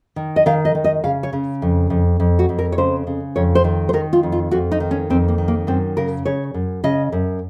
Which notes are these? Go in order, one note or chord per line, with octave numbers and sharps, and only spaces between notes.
D#3
D#5
D#3 F5
D#5
D#3
D#5
C#3 F5
C#5
C#3
F2
F2
F2
F#4
F2
A#4
C#5
C#3 C5
C#3
F2 C#5
C5
D#3
C5
D#3 A#4
F4
F2
F4
F2 F#4
D#4
D#3
C#4
F2 C4
A#3
D#3
A#3
F#2 C4
C#3 A#4
C#3 C#5
F#2
C#3 D#5
F#2